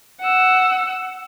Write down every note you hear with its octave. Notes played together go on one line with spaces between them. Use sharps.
F#5 E6